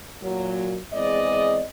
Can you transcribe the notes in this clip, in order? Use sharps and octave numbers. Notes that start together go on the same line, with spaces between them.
A#2 F#3
E2 G#3 C4 D5 D#5